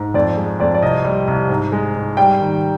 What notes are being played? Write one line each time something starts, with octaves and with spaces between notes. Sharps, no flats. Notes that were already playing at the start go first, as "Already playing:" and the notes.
Already playing: G#2
F2 D5
G#3
F2 D5
D5
C2 D#5
G3
C2
G#2
G#3
G#2
G3 G5
D#3